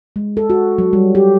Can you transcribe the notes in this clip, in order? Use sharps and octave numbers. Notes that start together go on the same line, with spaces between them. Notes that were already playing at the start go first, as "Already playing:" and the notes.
G#3
A4
F#4
F#3
G3
G4